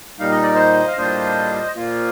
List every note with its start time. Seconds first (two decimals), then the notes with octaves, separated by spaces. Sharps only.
0.19 A#2 G3 A#3 D#4 F5
0.31 D#5
0.43 D5
0.54 C5 D#5
0.87 F5
0.97 A2 G3 A#3 D4 F4 C5 D#5
1.76 A#2 F3 A#3 F4